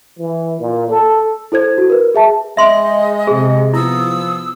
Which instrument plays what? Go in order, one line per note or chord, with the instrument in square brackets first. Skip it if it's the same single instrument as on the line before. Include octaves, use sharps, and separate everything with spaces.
[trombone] E3
A#2
A4
[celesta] E4 A4 C5 G#6
F#4
A#4 B4
G#4 E5 A5
[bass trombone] G#3 [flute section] D#5 [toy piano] E5 C6
[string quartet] C3 [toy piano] G#4
[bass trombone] F3 [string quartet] B3 [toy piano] E4 [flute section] D#6 E6